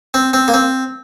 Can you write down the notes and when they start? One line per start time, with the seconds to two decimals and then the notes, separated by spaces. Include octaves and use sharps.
0.14 C4
0.33 C4
0.48 A#3
0.54 C4